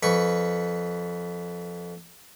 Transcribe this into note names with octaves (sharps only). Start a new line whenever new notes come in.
F2 B4 C#6